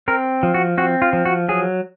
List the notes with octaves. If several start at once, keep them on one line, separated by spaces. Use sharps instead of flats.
C4 A#4
F3
F#4
C4 F#4
F4
F3
F#4
F#3 G#4